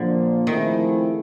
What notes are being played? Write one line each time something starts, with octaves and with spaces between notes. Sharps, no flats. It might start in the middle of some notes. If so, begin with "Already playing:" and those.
Already playing: A#2 D3 F3 A#3
D#3 F3 A3 C4 E4 G#4